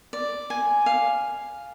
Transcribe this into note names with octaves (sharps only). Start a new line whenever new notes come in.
D5
G#5
F5